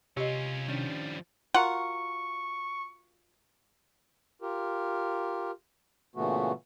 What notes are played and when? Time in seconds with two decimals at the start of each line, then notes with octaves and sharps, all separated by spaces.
0.17 C3 C#4 F4 G4 C#5 D#5
0.68 D#3 F3 G3 C#4 D4
1.55 F4 F#4 A#4 F#5 C#6
4.42 F4 G4 A#4
6.16 A#2 C#3 E3 A3 B3 F#4